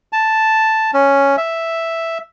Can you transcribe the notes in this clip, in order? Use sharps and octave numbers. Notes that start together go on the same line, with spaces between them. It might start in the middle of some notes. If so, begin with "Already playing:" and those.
A5
C#4
E5